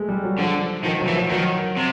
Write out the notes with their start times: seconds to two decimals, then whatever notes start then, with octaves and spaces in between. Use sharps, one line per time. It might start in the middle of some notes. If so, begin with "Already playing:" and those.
Already playing: G#3 A3
0.09 G3
0.23 F#3
0.39 D3 F3
0.84 D#3 F3
1.00 F#3
1.08 E3
1.15 F3
1.30 D#3 F#3
1.77 C3